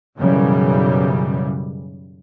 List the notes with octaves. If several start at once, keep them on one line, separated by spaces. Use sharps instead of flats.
B1 F#2 C#3 E3 G3